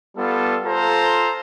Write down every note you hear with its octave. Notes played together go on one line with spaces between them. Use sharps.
G3 B3 F4 A4
F4 A4 C5 F5 A#5